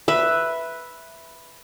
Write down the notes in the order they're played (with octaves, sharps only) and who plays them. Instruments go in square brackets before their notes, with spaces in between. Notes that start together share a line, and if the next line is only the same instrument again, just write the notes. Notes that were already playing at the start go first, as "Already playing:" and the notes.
[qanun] B4 E5